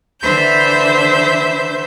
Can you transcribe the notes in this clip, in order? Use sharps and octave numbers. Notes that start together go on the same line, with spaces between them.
D3 E3 C5 E5 B5 G6